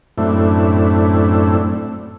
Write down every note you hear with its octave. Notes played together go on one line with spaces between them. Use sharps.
F#2 A2 A3 C4 D4 E4